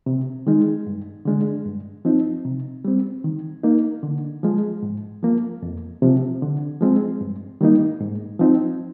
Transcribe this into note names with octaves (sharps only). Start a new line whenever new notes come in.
C3
D#3 G#3 D#4
G2
D3 G#3 D4
G2
F3 C4 D#4
C3
G3 C4
D#3
A#3 D#4
D3
F3 G#3
G#2
F3 A#3
F2
C3 F3
D3
F3 G#3 C4
G2
D#3 G3 A#3 D#4
G#2
F3 C4 D#4